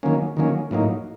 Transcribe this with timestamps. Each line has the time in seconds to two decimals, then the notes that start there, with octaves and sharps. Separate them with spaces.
0.03 D#3 F#3 A#3 C#4
0.37 D#3 F#3 A#3 C#4
0.71 A2 F#3 A#3 D#4